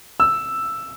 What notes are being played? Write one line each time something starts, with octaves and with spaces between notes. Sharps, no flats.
E6